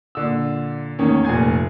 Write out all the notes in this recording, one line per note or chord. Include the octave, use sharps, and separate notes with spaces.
A#2 D3 E6
E2 A2 D#3 A#3 C#4
F1 A#2 A3 G#5 G#6